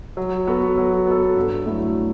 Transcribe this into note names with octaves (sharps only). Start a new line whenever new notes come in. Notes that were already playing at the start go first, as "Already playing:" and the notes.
F#3
B3 F#4 A4
F#3
B3 F#4 A4
G2
F#3 A3 E4